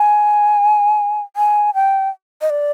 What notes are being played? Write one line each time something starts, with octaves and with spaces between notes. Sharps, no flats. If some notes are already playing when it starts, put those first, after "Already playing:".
Already playing: G#5
G#5
G5
D#5
D5